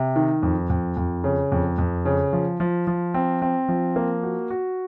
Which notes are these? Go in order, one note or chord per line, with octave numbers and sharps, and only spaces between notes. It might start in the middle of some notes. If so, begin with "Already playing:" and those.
Already playing: C3
D#3
F2
F2
F2
C#3
F2
F2
C#3
F3
F3
F3
C4
C4
F3
A#3
F#4
F#4